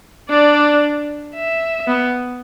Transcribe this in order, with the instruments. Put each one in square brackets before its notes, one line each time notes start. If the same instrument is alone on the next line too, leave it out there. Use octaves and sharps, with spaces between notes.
[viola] D4 [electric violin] D5
[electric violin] E5
[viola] B3